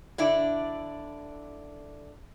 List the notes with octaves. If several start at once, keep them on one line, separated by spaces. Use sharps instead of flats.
D3 D4 E4